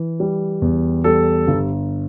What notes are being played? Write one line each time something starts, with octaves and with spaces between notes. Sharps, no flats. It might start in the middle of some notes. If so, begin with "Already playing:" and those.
Already playing: E3
G3
E2
G3 A4
G1